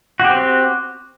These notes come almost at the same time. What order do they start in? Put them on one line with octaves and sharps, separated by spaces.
F#4 G4 C4